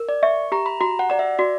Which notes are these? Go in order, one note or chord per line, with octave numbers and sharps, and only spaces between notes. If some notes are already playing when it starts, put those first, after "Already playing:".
Already playing: A#4
D5
E5 C#6
G4 A#5
B5
F#4 A#5
F#5
D5 A#5
E5
F#4 D5